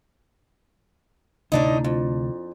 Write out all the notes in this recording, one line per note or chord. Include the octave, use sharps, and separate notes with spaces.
D2 A2 C3 A3 D4 D#4
F2